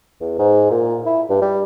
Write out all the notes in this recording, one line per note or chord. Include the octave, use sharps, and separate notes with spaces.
E2
G#2
A#2
E4
G2
G3